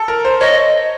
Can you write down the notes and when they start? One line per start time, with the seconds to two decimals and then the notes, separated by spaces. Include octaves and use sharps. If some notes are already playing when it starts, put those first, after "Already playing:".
Already playing: A4
0.08 A#4
0.25 C5
0.41 C#5 D#5